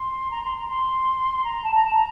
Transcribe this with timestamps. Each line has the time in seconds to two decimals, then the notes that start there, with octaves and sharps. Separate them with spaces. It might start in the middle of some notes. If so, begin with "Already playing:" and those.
Already playing: C6
0.31 A#5
0.43 C6
0.56 A#5
0.68 C6
1.44 A#5
1.63 A5
1.74 A#5
1.84 A5
1.94 A#5